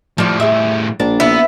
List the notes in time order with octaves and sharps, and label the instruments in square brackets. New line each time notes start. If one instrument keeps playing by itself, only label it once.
[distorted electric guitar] A2 G3 [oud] F3 D5
[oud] G#4 E5
[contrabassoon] A#1 [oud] D4
[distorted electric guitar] B3 [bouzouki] E4